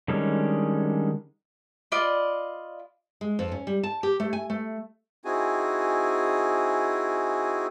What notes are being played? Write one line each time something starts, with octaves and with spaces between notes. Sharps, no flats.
D3 D#3 G3 G#3 C#4
F4 D5 D#5 B5
G#3
F2
C#4
G3
A5
G4
A3
G#5
A3
C4 D#4 E4 F#4 G#4 G#5